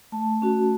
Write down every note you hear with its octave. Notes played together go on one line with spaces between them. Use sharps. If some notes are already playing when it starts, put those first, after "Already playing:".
A3 A5
C#4 F#4